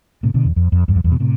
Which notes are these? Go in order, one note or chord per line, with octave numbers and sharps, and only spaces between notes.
A2 C3
B2 D3
E2
F2
F2
E2 G2
F2
E2 G2
B2
A2 C3